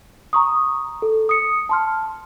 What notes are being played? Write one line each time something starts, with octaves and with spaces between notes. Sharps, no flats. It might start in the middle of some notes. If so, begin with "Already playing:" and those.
A#5 C#6 D#6
A4
D#6 C#7
A5 C6 F6